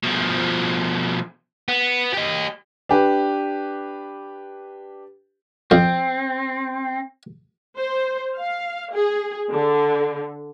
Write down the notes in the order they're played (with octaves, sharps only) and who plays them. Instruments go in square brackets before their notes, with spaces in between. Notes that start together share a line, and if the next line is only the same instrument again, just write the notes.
[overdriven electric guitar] B2 F3
B3
G4 D#5
[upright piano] D4 G4 B4
[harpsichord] F2 [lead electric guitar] C4
[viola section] C5
F5
G#4
D3